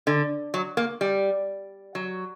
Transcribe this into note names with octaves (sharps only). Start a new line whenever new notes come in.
D3
F#3
A#3
G3
F#3